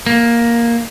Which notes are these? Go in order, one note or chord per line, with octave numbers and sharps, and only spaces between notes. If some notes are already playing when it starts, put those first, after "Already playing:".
A#3